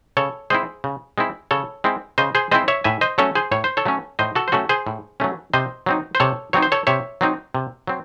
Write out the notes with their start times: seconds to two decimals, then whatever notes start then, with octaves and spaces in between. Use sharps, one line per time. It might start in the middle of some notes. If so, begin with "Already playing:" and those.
0.17 C#3 A4 C#5
0.50 G#3 C4 E4 G#4 C5
0.84 C#3
1.18 G#3 C4 E4
1.51 C#3 A4 C#5
1.84 G#3 C4 E4
2.18 C#3 C5 D#5
2.35 G#4 C5
2.51 G#3 C4 E4 C5 D#5
2.68 C#5 E5
2.84 A2 E5 G#5
3.01 C5 D#5
3.18 F#3 A3 C#4 A4 C#5
3.35 G#4 C5
3.51 A2 C#5
3.64 C5
3.77 A4 C#5
3.85 F#3 A3 C#4
4.19 A2 C5 D#5
4.35 F#4 A4
4.48 C5
4.52 F#3 A3 C#4 F#4 A4
4.69 G#4 C5
4.87 A2
5.20 F#3 A3 C#4
5.53 C3 C5 D#5
5.86 F#3 C4 D#4
6.15 C5
6.20 C3 A4 C#5
6.53 F#3 C4 D#4 C#5
6.63 C5
6.72 A4 C#5
6.87 C3 C#5 E5
7.21 F#3 C4 D#4
7.55 C3
7.87 F#3 C4